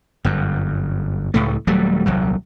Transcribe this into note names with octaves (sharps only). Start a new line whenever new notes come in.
G1 F#2
C#2 A2 A3
D#1 F#3 G3 A3
D#1 C2 F#3